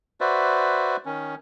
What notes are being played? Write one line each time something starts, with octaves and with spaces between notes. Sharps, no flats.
F#4 B4 C5 D5 E5
D#3 C#4